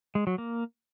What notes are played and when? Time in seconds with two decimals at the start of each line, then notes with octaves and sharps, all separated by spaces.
0.15 G#3
0.27 F#3
0.38 A#3